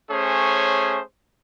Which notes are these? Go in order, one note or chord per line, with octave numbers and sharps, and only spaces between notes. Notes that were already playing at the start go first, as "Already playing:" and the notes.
A3 C#4 G#4 C5 C#5